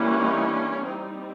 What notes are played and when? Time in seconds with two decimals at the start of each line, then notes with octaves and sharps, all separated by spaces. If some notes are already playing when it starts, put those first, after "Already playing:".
Already playing: E3 G3 A#3 C#4
0.18 D#4
0.51 D4
0.84 G3 C4 D#4